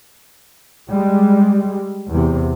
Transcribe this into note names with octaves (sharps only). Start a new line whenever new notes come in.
G3 G#3
E2 C3